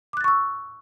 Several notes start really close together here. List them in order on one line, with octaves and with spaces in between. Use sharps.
D6 F#6 A6 C#6 E6